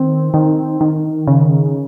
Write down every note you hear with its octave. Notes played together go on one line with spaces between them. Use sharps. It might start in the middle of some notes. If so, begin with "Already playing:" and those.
Already playing: D#3 C4
D#3
D#3
C#3